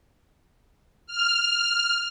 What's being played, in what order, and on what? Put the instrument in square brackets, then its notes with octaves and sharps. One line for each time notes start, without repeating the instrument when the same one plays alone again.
[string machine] F6